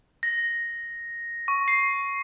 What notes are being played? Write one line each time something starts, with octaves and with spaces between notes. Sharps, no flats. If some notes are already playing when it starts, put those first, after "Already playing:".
A#6
C#6
C7